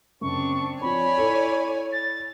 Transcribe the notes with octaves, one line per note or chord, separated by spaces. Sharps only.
F#2 C#3 C4 D4 C#6
F3 C4 C#5 D5 G#5 B5
E4 A4
A6